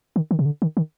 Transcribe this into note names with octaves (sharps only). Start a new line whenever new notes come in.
D#3
D#3
C3
D3
D#3
D#3